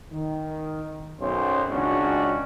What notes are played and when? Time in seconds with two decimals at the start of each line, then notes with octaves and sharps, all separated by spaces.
0.12 D#3
1.20 B1 F#2 F#3 C#4 C5
1.68 G#1 C#2 C#4 D4 F#4